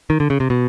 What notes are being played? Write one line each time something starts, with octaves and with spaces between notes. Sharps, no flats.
D#3
D3
C#3
C3
B2